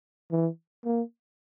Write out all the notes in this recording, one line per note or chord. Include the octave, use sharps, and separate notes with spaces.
E3
A#3